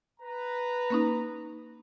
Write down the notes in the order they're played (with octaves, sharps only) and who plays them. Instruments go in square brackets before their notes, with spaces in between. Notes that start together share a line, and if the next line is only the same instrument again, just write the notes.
[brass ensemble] B4 A#5
[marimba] A#3 C#4 D#4